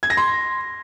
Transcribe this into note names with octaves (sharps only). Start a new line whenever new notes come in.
G#6
A#6
C6